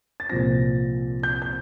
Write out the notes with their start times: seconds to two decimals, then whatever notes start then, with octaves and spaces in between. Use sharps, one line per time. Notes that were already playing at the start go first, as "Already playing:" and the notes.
0.20 A6
0.30 C2 A#2 F3 C4 A#6
1.23 G6
1.42 G6